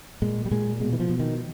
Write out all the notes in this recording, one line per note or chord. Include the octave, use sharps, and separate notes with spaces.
A#2 G#3
G3
A#2 G#3
B2 G#3
E3
F3
B2
D#3